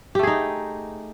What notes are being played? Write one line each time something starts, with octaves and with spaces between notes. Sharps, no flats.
A3 D#4 G4 G#4